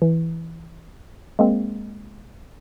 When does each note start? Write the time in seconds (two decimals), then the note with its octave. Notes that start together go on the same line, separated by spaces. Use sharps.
0.02 E3
1.39 G#3 A#3 C4